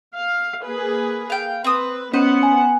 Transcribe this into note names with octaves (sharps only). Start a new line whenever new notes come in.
F5
A#3 G#4 B4
F5 G5
C4 B4 D#6
B3 C#4 B4 C5 D#5 F#5
G#5